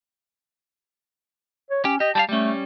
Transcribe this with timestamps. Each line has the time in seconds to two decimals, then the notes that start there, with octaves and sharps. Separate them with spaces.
1.71 C#5
1.85 C#4 G4
2.00 G4 D#5
2.15 G3 E4 F5 A5
2.29 G3 A3 C#4